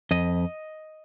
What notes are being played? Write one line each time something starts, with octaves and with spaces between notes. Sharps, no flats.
F2 D#5